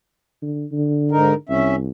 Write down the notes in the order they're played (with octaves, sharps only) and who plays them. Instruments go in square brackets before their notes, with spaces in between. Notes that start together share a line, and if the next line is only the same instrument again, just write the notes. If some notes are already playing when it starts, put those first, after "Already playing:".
[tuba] D3
D3
[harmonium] G#2 D#4 A#4
[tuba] C2 [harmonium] C#4 E5